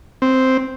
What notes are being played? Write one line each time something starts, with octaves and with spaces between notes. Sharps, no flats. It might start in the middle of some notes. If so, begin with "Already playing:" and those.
C4